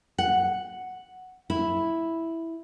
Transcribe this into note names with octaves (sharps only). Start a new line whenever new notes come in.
F#5
E4